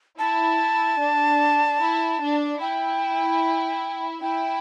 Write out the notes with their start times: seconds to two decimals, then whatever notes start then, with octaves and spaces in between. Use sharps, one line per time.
0.19 E4 A5
1.00 D4
1.81 E4
2.21 D4
2.61 E4 G5
4.22 E4 G5